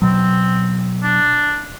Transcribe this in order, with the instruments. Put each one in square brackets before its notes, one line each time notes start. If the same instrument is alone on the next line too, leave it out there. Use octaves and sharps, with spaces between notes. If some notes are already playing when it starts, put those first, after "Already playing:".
[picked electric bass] B2 F#3 [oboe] C4
[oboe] D4